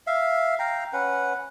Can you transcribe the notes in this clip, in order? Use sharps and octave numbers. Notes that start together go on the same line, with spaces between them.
E5 F5
F5 G5 A#5
C#4 B4 F#5